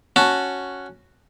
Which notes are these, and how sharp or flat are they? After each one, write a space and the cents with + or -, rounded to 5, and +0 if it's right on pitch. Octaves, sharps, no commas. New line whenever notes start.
C#4 +0 F#4 +0 A5 +0